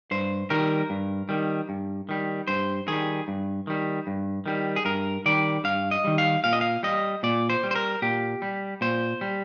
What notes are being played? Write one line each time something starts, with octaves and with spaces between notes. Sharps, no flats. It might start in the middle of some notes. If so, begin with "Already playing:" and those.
G2 C5
D#3 G3 A#4
G2
D#3 G3
G2
D#3 G3
G2 C5
D#3 G3 G#4
G2
D#3 G3
G2
D#3 G3
G#4
G2 A#4
D#3 G3 D5
G2 F5
D#5
D#3 G3
F5
A#2 F5
D#5
F5
G3 D#5
A#2 D5
C5
G3
C5
A#4
A#2 G4
G3
A#2 C5
G3